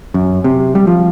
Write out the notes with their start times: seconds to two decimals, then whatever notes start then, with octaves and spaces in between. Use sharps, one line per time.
0.14 F#2
0.44 C3
0.75 G3
0.87 F3